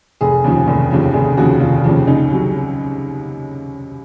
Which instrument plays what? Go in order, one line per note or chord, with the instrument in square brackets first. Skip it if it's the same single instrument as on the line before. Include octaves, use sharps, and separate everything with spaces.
[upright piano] F1 G#4
D#2 C#3 F3
F1
D#2 C#3 F3
F1 G#4
D#2 C#3 F3 F#4
F1 F4
D#2 C#3 F3
C#2 D#4
C3 F#3